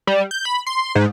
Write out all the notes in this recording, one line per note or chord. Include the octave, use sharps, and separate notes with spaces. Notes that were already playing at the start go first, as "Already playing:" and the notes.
G3
G6
B5
C6
G#2